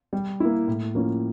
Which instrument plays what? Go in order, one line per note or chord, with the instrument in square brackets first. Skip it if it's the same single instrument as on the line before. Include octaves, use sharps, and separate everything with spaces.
[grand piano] G3
A#3 E4
A2
F3 A#3 C#4 E4